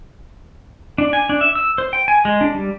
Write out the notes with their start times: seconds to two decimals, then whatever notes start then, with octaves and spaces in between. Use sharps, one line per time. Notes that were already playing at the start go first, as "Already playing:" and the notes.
0.98 D4
1.13 G#5
1.29 D4
1.41 E5
1.55 E6
1.78 C5
1.93 G5
2.08 G#5
2.25 G#3
2.41 D4
2.54 G3